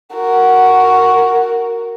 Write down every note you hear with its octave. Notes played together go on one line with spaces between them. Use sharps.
F#4 A#4